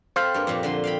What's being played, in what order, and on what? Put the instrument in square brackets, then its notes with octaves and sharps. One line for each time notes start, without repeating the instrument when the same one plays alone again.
[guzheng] C4 A4 B5 [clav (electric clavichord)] C5 F5
[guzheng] G2 A#3
F2 A#2
D3 F3 C6
F5 G5 B5